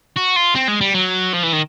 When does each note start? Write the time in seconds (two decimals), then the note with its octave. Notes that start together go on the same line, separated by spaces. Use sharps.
0.16 F#4
0.36 F4
0.55 C4
0.68 G#3
0.81 G3
0.94 F#3
1.33 F3
1.43 E3
1.53 D#3